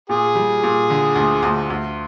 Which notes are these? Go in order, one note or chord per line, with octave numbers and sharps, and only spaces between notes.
A#2 G#4
G3
A#2
D3
D2
D2
D2